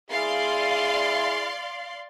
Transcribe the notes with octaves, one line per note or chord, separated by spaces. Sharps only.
E4 G#4 D5 F5 C6